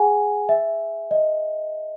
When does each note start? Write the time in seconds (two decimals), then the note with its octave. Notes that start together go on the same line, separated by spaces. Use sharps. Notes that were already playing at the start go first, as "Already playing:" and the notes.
Already playing: G#4 F#5 G#5
0.49 E5
1.11 D#5